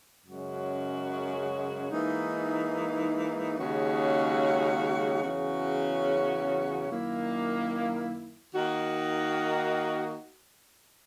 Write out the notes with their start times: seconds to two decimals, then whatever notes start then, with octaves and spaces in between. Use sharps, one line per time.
0.25 F#2 C#3 G#3 C#4 F#4
1.90 G#2 E3 A#3 D#4
3.56 D#2 C#3 G#3 C#4 F#4
5.22 E2 C#3 F#3 C#4 F#4
6.88 F#2 D#3 A#3 E4
8.54 D#3 A#3 D#4 F#4